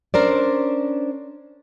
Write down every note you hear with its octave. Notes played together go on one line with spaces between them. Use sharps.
C#4 D4 A#4 C5 D5